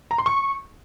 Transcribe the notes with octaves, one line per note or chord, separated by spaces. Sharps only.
A#5
C6
C#6